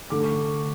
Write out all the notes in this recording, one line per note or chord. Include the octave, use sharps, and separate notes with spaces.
D3 A3 D6
C#6